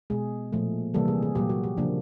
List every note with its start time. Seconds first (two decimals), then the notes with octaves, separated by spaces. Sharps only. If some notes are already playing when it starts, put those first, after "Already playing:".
0.10 B2 G#3 G#4
0.52 A#2 F3 A3
0.94 C3 E3 G3 A#3 A4
1.08 G#4
1.22 G#4
1.35 A#2 F#3 A#3 G4
1.50 F#4
1.64 G4
1.77 C#3 F3 A#3 D4